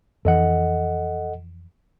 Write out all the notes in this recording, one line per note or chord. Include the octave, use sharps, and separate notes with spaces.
F2 E3 A4 D#5 F#5